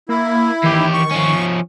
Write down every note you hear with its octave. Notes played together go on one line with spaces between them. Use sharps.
A#3 E4
E2 D#3 G4
C#6
F3 C#4